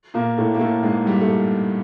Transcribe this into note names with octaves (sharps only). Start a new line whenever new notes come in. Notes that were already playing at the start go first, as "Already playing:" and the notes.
A#2 A#3
A2 A3
A#3
A2 A3
G#2 G#3
G2 G3
A3